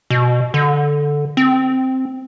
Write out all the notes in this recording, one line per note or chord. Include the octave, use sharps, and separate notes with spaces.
B2
D3
C4